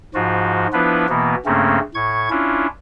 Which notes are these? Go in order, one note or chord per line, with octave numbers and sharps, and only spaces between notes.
G#2 F3 F4 F#4
F3 B3 D4 E4 F4 B4
B2 E3 A#3 B3
G2 C#3 A3 A#3 C4 C#4
A2 C#6 G#6
C#4 D4 E4 F4